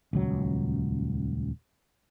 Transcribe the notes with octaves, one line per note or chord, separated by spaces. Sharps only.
D#1 C#2 F#3